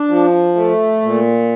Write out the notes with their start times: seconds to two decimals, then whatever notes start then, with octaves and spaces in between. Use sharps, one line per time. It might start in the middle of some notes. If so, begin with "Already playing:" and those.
Already playing: D4
0.08 F3
0.56 A3
1.02 A#2